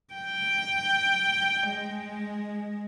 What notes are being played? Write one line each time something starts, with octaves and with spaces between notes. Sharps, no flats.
G5
G#3